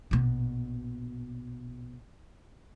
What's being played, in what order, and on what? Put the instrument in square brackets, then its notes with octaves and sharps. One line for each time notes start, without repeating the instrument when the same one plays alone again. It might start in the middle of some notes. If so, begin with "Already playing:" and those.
[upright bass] A#1 B2